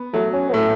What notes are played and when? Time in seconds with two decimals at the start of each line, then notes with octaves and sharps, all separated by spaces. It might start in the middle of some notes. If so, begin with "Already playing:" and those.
Already playing: B3
0.13 F#3 A3
0.33 C#4
0.49 B3
0.53 A2 A3